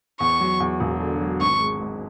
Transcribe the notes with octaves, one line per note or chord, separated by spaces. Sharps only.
E2 C#6
F#3
E2
E1
D3
F#3
G#1 C#6
G#3
G#2